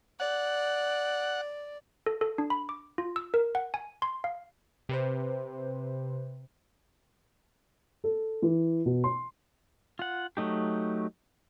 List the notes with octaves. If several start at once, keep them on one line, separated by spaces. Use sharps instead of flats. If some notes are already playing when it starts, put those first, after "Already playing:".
D5 F#5
A4
A4
D4
B5
D6
F4
E6
A#4
F#5
G#5
C6
F5
C3 B4 C5
A4
E3
B2
C6
F4 F#5
F#3 A3 D#4 G4